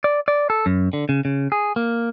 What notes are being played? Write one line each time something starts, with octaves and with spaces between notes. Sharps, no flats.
D5
D5
A4
F#2
D3
C#3
C#3
G#4
A#3